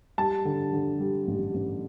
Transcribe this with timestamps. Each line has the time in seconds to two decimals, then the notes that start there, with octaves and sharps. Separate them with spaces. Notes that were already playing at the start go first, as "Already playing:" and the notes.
0.18 G3 A5
0.45 D3
0.73 D3
1.00 G3
1.28 A1
1.54 A1